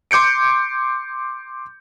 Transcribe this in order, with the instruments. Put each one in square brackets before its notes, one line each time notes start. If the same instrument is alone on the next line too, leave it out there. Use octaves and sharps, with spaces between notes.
[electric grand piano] C6 D6 G6 C#7 D7